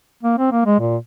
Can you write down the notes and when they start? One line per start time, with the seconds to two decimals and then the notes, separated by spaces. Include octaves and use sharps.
0.23 A#3
0.38 C4
0.52 A#3
0.66 G#3
0.80 A#2